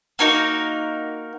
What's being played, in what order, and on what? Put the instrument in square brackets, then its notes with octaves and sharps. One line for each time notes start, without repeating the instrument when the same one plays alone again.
[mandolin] A#3 D#4 F#4 A#4